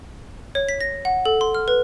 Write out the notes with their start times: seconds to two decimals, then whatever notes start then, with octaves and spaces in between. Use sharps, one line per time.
0.55 C#5
0.69 B6
0.81 A#6
1.05 F#5
1.26 A4
1.41 C6
1.55 F6
1.68 B4